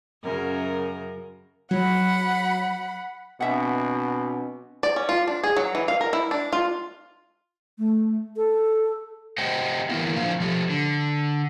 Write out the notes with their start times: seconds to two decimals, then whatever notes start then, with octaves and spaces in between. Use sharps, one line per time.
0.23 F#2 C#3 A#4
1.71 F#3 F#5 B5
3.41 B2 C4 D4 E5 F#5 G#5
4.83 D5
4.96 C#4
5.09 F4
5.28 D4
5.44 G#4
5.57 F#3
5.75 E3
5.88 F5
6.01 A#4
6.13 E4
6.31 D4
6.53 F4
7.79 A3
8.37 A4
9.38 G4 C5 D#5 F#5 G5
9.89 E3 A#3 B3 E4
10.16 A#2 D3 F3 D4 C5 F5
10.40 F3 G4 A4
10.70 D3